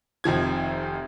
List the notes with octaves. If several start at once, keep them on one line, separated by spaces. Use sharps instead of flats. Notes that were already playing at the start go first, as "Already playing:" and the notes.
F1 D#3 F3 G#6